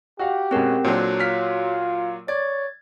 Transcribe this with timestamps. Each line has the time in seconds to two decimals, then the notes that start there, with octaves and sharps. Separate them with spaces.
0.19 F#4 G4 F5 F#5
0.51 B2 G#3 C4 C#4 A#4 F#5
0.84 A#2 F#3 D4 F#4 A4 C5 C#5 F#6
1.20 F4 F6 B6
2.28 C#5 D5 G#6 A6